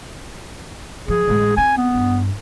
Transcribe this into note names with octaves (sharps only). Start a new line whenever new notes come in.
F3 G#4
A1 G#3
C4 G#5
B3
G2